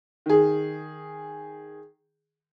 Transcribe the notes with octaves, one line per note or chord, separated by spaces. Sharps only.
D#3 G#4